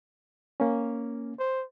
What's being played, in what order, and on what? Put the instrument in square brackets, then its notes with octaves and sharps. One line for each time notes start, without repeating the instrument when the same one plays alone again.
[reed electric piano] A#3 C#4
[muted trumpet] C5